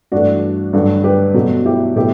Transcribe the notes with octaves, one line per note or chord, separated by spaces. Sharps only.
G2 E3 A3 D4 F#4
G2 D3 F#3 A3 F#4 A4
G4 B4
B2 F#3 A3 F#4 A4
E4 G4
B2 F#3 A3 E4 G4